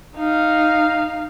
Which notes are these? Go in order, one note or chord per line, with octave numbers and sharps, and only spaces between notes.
D#4 F5